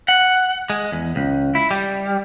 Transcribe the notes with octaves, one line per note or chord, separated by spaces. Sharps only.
F#5
G#3
E2
C#2
E4
G3